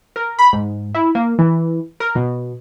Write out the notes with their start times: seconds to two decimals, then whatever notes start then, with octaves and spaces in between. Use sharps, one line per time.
0.16 A#4
0.39 B5
0.53 G#2
0.95 E4
1.15 A#3
1.39 E3
2.00 A#4
2.15 B2